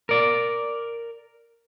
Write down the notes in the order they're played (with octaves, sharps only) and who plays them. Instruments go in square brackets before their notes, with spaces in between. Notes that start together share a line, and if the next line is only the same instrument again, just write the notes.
[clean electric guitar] A#4 D5